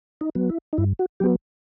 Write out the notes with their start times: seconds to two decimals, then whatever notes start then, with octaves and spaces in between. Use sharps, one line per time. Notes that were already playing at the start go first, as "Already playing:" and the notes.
0.21 D#4
0.35 F#3 B3
0.50 E4
0.73 D#4
0.78 G2 E4
0.99 F#4
1.20 F#3 B3 G4